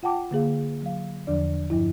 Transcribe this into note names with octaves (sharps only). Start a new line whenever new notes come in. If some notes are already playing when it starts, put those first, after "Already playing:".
F4 F#5 G5 A5 D6
D3 A#3 G#4 F5
F#3 F5
E2 D3 F3 D4 D5
G2 F3 E4